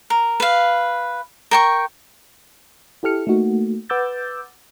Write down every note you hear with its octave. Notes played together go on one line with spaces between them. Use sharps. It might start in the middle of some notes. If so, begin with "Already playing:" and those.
A#4
B4 F5
A#4 G5 C#6
E4 G4 A4 F6 C#7
A3 A#3 D#4 F#4
B4 F#5 D6 E6 G6 A6